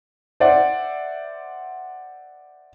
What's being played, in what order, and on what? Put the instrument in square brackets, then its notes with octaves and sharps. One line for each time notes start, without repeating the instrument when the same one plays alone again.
[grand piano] C5 D5 E5 F#5